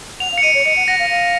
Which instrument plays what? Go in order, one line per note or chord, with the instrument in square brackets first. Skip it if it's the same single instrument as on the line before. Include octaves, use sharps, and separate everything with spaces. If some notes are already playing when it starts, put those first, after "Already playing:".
[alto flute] F#5 [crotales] F7
[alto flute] F5
[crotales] C#7
[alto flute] D#5 [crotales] D#7
[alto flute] C#5
[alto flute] D#5 [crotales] C#7
[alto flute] F#5
[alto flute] F#5 [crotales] A#6
[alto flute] F5
F5